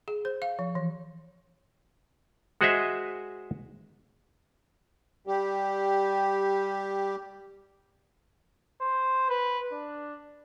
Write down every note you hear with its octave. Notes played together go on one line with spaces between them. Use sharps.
G#4
C5
F5
F3
E3
G#3 F#4 G#4 C5 D#5 E5
G3 G4
C5
B4
D4